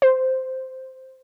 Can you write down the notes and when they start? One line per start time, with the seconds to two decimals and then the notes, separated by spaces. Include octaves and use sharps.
0.02 C5